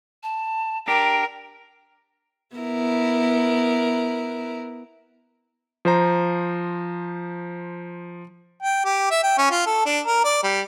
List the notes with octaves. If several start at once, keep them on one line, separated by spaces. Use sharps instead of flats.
A5
D4 G4 A#4 G5
B3 E4 A#4
F3 C5 A#5
G5
G4
E5
G5
C#4
F4
A4
D4
A#4
D5
G3